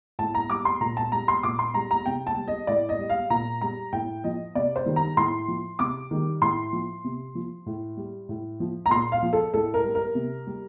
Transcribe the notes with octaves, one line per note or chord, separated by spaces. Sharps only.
A2 A5
A#5
G3 D6
C6
A#2 A#5
A5
G3 A#5
C6
A#2 D6
C6
G3 A#5
A#5
C3 G5
A5
G3
D#5
A2 D5
D#5
G3
F5
A#2 A#5
G3 A#5
A2 G5
F3 D#5
C3 D5
C5
D#3 G3
A#5
A2 C6
F3
C3 D6
D#3 G3
A2 C6
F3
C3
F3
A2
G3
A2
F3
A#5
A#2 C6
F5
F3
A4
A2 A4
A#4
G3
A#4
C3
G3